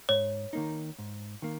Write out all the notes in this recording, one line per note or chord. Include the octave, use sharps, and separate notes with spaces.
G#2 C#5
D#3 A#3 D#4
G#2
D#3 A#3